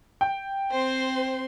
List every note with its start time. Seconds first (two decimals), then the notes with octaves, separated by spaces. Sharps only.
0.21 G5
0.71 C4 C5 C6